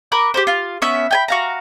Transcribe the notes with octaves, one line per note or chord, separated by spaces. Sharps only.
A#4 B5 D6 F#6
G4 A#4 C5
F4 F5
B3 C#4 E5
G5 G#5 B5
F#4 F5 A#5